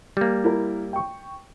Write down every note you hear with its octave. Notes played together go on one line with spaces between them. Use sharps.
G3 A#3
E4 A#4
G5 C#6